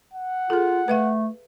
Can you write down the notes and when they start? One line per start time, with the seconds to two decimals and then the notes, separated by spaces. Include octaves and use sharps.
0.13 F#5
0.50 F4 G#4 A4
0.88 A3 B4 E5 F5